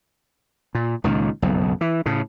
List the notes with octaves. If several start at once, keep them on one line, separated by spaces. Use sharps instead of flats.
A#2
C#2 A#2 D#3
F#1 B1 F2
E3
A2 C#3